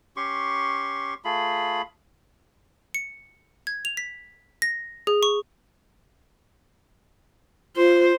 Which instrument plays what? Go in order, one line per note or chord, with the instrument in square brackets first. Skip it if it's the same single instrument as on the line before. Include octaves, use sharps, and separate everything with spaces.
[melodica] C#4 G4 C6 C#6
A3 F4 G#4 B5
[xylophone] C#7
G#6
F7
B6
A#6
G#4
C#6
[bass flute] F4 [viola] C5